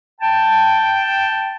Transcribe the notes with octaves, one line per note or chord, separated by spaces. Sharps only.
G5 A5